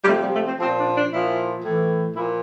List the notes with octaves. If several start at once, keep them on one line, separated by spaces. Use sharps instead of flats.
G3
C3 F3 A3
G3
A3
C4
F3 C4
A#2
D4
D4
A#2 F3 E4
A2 E3
A#2 F3 E4